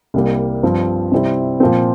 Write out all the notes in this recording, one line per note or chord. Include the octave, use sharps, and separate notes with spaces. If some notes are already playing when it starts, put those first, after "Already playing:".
C2 C3 G3 A#3
G2 F3 C4
C3 G3 C4 E4
A#2 F3 C4